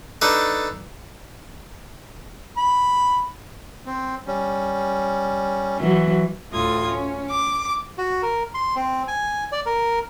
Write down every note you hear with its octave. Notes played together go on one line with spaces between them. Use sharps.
D4 D#4 A4 B4
B5
C4
G3 C#4
E3 F#3
D2 A2 A3 F4 D#6 G#6
C#4
D6
F#4
A#4
C6
C4
G#5
D5
A#4